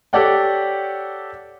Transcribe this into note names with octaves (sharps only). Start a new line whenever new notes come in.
G4 A4 C#5 D5 F#5 G5